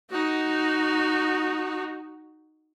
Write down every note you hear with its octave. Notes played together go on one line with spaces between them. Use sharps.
D#4 F#4